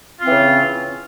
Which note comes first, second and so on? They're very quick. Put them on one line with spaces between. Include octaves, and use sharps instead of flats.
F4 C4 E3 C#3